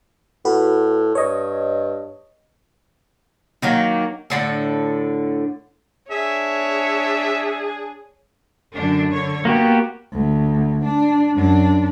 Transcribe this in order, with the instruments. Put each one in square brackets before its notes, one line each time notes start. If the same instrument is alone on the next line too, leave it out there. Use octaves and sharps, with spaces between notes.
[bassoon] A2 [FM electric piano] F#4 B4
[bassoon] G2 [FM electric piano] C#5 D#5
[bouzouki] D#3 F#3 A#3
A2 D3 A4
[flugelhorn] D4 [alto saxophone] G#4 [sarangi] C#5 [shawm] E5
[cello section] F#2 D3 D4
D3 C#5
[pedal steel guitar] A#3 F#4 G4 [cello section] B3
[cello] D2
D4
F#2 D4